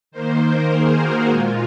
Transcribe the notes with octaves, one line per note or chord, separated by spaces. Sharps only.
D#3 A#3 C5
A#4
G#4
F#4
A#2 G#3 F4